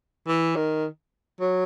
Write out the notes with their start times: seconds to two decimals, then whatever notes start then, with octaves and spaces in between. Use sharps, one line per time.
0.27 E3
0.56 D#3
1.41 F#3